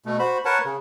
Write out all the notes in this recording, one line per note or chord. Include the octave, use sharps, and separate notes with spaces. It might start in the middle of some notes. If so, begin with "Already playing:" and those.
B2 A3
F#4 C5 B5
A#4 B4 C#5 F#5 A5
C#3